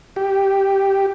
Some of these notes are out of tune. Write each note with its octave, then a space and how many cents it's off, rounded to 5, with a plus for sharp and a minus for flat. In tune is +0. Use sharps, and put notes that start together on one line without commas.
G4 -5